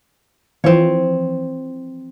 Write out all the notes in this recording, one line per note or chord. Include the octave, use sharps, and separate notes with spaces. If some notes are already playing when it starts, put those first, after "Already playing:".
E3 F3 C4 C#5